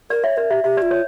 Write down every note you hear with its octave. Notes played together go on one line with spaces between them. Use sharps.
A#4 D5
C#5 E5
A#4 D5
G4 E5
G4 E5
F4 D5
C#5